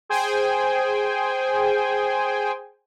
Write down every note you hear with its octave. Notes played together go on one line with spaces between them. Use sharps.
G#4 C5 G5 G#5